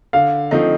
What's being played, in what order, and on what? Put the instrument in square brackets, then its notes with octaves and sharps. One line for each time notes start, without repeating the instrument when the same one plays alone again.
[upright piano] D3 [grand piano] F5
[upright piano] F3 A3 C4 D#4 [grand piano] D#5